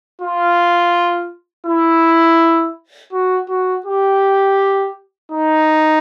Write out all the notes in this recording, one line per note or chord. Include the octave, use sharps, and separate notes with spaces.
F4
E4
F#4
F#4
G4
D#4